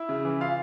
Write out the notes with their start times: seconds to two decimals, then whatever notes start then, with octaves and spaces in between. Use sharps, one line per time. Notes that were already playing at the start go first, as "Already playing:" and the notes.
Already playing: E4 E5
0.09 C#3
0.25 E3
0.41 F4 F5